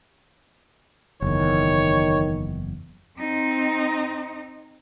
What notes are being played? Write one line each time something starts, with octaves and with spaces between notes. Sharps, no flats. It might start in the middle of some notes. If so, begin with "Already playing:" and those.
F#1 E2 D#3 C#5
C4 D#4